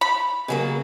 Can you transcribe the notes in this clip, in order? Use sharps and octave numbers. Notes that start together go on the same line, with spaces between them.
B5
C#3 F#3 A#3